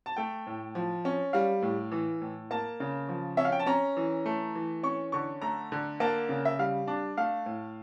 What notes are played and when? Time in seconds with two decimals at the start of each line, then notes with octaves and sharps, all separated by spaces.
0.06 A5
0.16 A3 G5
0.47 A2
0.75 F3
1.05 C#4
1.33 G3 F5
1.62 A2
1.91 E3
2.21 A2
2.51 A#3 A5
2.80 C#3
3.09 F3
3.37 C#4 E5
3.45 F5
3.52 G5
3.59 A5
3.66 C#4 A#5
3.97 E3
4.26 A3
4.55 E3
4.83 C#4 C#6
5.12 D3 C#6
5.42 A3 A#5
5.72 D3
6.00 A#3 A5
6.29 C#3
6.45 E5
6.59 G3 F5
6.88 D4
7.17 A3 F5
7.46 A2